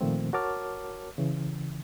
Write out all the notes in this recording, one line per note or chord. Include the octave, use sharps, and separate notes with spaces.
A#2 D#3 F3 A3 A#3 C4
F#4 A#4 C#5 A5 D6 F6
C#3 E3